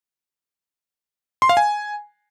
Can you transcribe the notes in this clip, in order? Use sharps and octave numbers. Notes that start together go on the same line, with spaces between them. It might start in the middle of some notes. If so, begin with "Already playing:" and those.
C6
F5
G#5